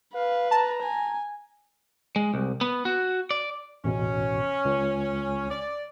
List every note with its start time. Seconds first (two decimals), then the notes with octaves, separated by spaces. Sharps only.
0.15 B4 F5
0.51 A5 A#5
0.82 G#5
2.16 G#3
2.34 C2
2.61 B3
2.85 F#4
3.31 D5
3.84 A1 E2 B2 C#4
4.65 C#2
5.50 D5